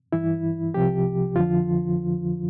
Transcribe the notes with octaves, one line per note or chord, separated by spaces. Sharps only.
G2 E3 E4
C2 C3 F3 G4
F2 D3 F3 F4